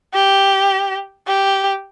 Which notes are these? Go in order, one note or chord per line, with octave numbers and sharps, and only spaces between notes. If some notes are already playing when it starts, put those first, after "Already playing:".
G4
G4